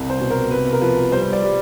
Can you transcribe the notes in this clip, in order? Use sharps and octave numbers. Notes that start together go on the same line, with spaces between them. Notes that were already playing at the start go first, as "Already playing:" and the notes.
Already playing: C2
C5
B2
A#4
C3 B4
A#4
F3 B4
G3 C5
D5
G3